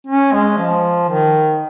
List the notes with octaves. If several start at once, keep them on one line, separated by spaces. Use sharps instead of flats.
C#4
G#3
F3
D#3